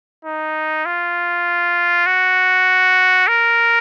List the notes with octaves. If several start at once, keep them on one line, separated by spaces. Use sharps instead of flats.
D#4
F4
F#4
A#4